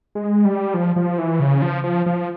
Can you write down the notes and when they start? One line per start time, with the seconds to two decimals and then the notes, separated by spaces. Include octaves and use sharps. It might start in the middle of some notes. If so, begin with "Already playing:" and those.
0.15 G#3
0.45 G3
0.74 F3
0.96 F3
1.18 E3
1.40 C#3
1.62 F3
1.84 F3
2.06 F3